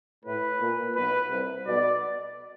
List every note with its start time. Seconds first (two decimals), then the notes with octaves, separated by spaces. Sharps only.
0.25 A2 B4
0.60 A#2
0.95 B1 B2 B4
1.30 C2 C3
1.65 B1 B2 D5